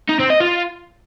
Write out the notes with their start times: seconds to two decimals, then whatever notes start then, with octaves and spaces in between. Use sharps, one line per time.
0.09 D#4
0.19 C4
0.30 D#5
0.41 F4